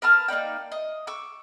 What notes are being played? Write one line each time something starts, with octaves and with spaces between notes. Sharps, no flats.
A#4 B4 A5 F6
A#3 D#4 D5 G5
D#5
C#6 D6 E6